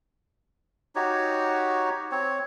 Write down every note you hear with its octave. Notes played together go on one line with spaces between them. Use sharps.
D#4 F#4 G4 C#5
C4 C#5